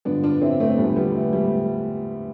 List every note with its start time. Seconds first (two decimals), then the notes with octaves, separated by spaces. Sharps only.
0.05 G2 D3 F3 B3 D4
0.23 D4 F4
0.41 C4 E4
0.60 A3 C4
0.77 E2 D3 F3 G3 B3
0.96 G3 B3
1.15 A3
1.33 G3